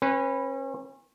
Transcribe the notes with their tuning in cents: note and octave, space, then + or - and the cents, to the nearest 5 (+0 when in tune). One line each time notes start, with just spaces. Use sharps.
C#4 -35 B4 +0